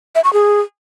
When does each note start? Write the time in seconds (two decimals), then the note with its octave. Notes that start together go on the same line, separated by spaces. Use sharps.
0.15 E5
0.24 C#6
0.33 G#4